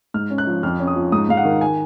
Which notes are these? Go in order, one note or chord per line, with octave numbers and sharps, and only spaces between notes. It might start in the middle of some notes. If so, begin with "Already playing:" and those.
G#2 F6
C#4
F#6
F3
F2 F6
C#4
D#6
F3
G#2 D#6
G#2 F5
F#5
D#3
G#5